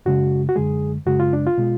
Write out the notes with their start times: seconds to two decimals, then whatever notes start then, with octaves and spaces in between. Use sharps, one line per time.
0.06 F#2 C#3 G#3 F#4
0.49 F#4
0.56 F#2 D3 G#3 G#4
1.06 F#2 C#3 G#3 F#4
1.20 F4
1.33 D4
1.47 F4
1.58 B2 G#3